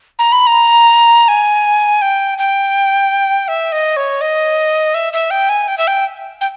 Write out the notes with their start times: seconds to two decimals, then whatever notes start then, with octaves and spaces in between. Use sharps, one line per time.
0.19 A#5
0.32 B5
0.47 A#5
1.28 G#5
2.02 G5
2.38 G5
3.48 E5
3.72 D#5
3.96 C#5
4.21 D#5
4.94 E5
5.13 E5
5.30 G5
5.49 G#5
5.68 G5
5.78 E5
5.87 G5
6.41 G5